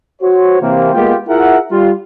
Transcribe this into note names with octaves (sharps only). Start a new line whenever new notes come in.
F#4 C5 C#5
C3 E3 A#3 C4
G#3 A#3 B3 F4 G4
E4 F4 G#4 A#4 E5 F#5
G3 F4